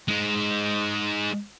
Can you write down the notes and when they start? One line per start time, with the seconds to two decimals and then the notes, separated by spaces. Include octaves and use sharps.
0.08 G#3 D#4